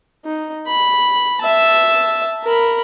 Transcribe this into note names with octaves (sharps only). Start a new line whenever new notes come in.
D#4
B5
E5 A5
A#4 B5